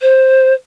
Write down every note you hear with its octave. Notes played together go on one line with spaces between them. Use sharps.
C5